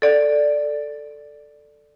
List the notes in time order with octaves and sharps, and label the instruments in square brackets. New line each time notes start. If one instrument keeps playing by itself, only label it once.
[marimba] A4 D5